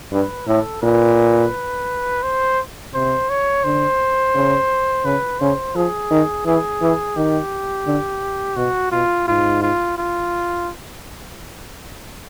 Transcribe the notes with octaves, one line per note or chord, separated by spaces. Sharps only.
G2 B4
A2 A4
A#2 B4
C5
C3 C5
C#5
D3 C5
C#3
C#3 B4
C#3 C5
F3 G#4
D#3
E3 G#4
E3
D#3 G4
D3
B2 F#4
B2 F4
G#2 F4
F4
F4